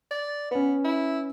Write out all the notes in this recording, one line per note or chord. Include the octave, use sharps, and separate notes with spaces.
D5
B3 C#4 B4
E4